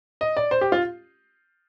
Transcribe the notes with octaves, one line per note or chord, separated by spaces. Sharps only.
D#5
D5
C5
G4
F4